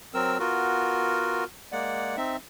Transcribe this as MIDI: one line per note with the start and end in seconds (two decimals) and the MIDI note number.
0.14 0.38 54
0.14 0.38 60
0.14 0.38 70
0.14 0.38 88
0.39 1.44 59
0.39 1.44 65
0.39 1.44 66
0.39 1.44 70
1.72 2.16 56
1.72 2.16 58
1.72 2.16 74
1.72 2.16 78
2.17 2.37 60
2.17 2.37 63
2.17 2.37 76